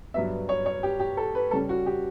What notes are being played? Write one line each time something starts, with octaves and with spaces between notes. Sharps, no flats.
G2 F#3 B3 E5
C#5
C#5
G4
G4
A4
B4
C#3 G3 C#4 A4
F#4
G4